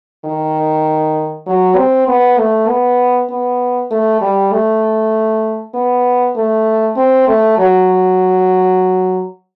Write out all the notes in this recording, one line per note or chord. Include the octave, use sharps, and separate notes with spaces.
D#3
F#3
C4
B3
A3
B3
B3
A3
G3
A3
B3
A3
C4
A3
F#3